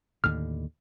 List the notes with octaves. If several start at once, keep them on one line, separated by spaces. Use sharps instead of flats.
D#2 A2 D3 F6